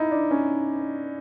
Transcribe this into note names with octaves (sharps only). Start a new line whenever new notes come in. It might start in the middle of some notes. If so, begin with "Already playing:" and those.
Already playing: D#4 E4
D4
C#4